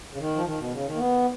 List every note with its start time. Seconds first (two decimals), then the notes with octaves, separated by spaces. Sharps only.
0.13 C#3
0.19 D#3
0.36 F3
0.45 D#3
0.58 B2
0.72 C#3
0.86 D#3
0.94 A#3
0.98 B3